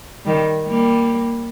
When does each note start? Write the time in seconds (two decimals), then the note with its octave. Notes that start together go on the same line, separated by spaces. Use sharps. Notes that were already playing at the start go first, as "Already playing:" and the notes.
0.25 D#3 G3
0.67 G3 A#3